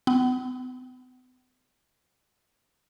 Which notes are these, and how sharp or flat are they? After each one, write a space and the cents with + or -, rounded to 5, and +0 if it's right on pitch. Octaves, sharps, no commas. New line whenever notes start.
B3 +40